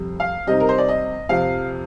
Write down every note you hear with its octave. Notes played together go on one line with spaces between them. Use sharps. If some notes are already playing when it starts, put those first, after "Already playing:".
Already playing: F2 C3 G3
F5
C3 G3 C4 D#4 D#5
A#4
C5
D5
D#5
F2 C3 F3 F5